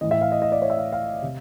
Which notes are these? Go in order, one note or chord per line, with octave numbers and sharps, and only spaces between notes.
A2 E3 D#5
E5
F5
D#5
D#5
D5
C#5
E5
F5
F5
C3